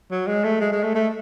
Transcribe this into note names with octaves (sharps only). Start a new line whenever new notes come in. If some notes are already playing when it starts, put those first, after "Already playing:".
F#3
G#3
A3
G#3
G#3
A3
A3